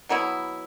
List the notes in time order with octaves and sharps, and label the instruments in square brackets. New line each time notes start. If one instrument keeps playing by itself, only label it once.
[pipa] B2 F#3 B3 E4